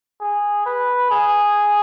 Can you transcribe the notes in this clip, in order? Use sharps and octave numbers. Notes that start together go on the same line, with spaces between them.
G#4
B4
G#4